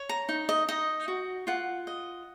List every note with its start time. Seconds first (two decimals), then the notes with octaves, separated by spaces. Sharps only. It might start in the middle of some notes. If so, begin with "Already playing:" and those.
Already playing: C#5
0.09 A#5
0.29 D#4
0.49 D#5
0.68 D#4 D#5
1.08 F#4
1.47 F4 F#5
1.87 D#5